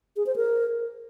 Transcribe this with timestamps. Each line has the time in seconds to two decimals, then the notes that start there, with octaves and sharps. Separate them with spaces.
0.17 G#4
0.26 C5
0.36 A#4